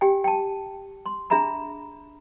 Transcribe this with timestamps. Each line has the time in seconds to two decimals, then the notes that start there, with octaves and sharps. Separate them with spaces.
0.01 G4 G5 G#5
0.24 G5 A5
1.06 C6
1.30 D4 G#4 E5 A#5 B5